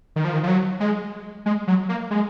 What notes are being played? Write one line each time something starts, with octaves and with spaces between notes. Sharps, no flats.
D#3
F3
D#3
F3
F#3
G#3
G#3
F#3
A#3
G#3